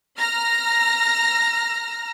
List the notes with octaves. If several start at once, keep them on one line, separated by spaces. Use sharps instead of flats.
A#5 F6 A#6